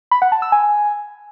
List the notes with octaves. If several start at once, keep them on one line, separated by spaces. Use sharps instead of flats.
B5
F#5
A5
E6
G#5